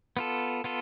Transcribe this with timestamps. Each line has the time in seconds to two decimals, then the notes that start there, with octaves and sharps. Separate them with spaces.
0.17 B3 F4 A4
0.64 B3 F4 A4